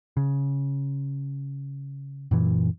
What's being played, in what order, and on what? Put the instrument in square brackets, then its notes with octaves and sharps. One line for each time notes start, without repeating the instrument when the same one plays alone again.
[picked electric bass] C#3
F#2 A#2 E3